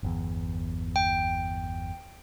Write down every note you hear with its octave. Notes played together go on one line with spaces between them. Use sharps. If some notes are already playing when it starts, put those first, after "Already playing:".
G1 E2
G5